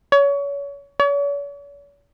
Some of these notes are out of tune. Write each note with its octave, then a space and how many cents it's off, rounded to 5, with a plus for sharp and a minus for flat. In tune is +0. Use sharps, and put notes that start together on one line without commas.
C#5 +30
C#5 +45